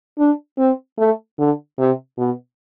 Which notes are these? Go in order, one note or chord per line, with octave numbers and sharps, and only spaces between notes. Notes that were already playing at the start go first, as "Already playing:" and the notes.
D4
C4
A3
D3
C3
B2